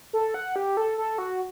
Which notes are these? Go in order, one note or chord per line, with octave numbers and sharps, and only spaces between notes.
A4
F#5
G4
A4
A4
F#4